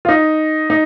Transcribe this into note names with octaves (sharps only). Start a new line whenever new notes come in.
F4
D#4
D#4